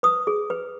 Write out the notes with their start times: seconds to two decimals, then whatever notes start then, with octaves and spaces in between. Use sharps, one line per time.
0.03 B4 D#6
0.27 G#4
0.50 B4